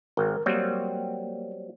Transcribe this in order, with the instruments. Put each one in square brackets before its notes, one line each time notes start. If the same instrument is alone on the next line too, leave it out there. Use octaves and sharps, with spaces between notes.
[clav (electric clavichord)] G#1 [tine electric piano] A#4
[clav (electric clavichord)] F#3 G3 C4 [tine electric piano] A#3